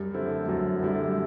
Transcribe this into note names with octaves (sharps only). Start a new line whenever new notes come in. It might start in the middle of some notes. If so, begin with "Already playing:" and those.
Already playing: F#2 G3
D3 A3 C4 E4
F#2 F#3
D3 G3 A3 C4 E4
G3